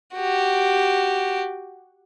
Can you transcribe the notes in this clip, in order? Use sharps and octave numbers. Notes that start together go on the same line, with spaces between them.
F#4 G4